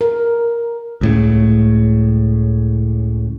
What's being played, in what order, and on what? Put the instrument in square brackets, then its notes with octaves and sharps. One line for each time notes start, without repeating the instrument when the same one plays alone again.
[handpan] A#4
[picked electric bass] C#2 A2 C#3